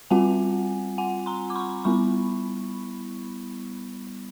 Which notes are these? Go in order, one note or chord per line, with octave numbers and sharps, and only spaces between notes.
G3 C4 F4 F#5 G#5
F#5 G#5
A#5 C6
D6
B5 C#6
G3 B3 E4 B5 C#6